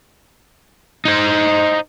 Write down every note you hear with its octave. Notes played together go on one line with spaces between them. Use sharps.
D#4 C5